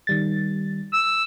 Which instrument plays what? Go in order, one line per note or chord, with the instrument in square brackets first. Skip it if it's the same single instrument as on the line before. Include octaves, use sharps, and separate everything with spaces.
[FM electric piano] D#3 G3 A6
[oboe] E6